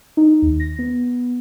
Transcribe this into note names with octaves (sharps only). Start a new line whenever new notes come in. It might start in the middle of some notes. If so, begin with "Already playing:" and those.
D#4
D#2
A#6
B3